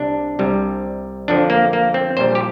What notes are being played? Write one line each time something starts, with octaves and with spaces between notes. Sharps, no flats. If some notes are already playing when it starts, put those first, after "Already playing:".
Already playing: C2 C3 G3 D4
C2 C3 G3
F2 D3 F3 D4
A#3
A#3
C4
A#1 A#2 G3 C5
G4